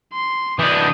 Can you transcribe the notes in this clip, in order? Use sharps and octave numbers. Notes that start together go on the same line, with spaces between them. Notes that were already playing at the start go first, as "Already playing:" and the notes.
C6
E3 D4 D#6 G6